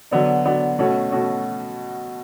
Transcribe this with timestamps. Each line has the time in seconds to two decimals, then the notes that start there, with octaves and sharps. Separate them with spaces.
0.11 D3 F#3 B3 D4
0.45 D3 F#3 B3 D4
0.79 B2 A3 C#4 F#4
1.12 B2 A3 C#4 F#4